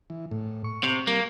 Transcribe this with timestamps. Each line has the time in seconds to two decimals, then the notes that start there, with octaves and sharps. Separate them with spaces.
0.10 E3
0.31 A2
0.64 C#6
0.83 C3
1.07 G3 A#3 A#4